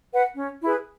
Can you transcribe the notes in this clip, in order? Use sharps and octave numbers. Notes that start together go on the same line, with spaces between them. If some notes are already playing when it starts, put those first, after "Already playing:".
B4 F#5
C#4
E4 G#4 B4